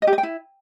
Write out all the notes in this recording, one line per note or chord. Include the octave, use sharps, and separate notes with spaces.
D#5
G4
D#5
G5
E4